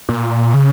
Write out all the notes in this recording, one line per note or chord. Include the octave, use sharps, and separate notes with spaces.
A#2
C#3